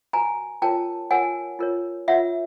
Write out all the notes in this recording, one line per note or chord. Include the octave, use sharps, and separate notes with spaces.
F#4 B4 G#5 A#5
F4 A#4 C#5 G5 A5
F4 A#4 C#5 F#5 G#5
F4 A#4 C#5
F4 A#4 C#5 E5 F#5